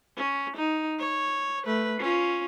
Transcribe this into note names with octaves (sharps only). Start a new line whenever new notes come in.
C#4
D#4
C#5
A3 B4
C#4 F4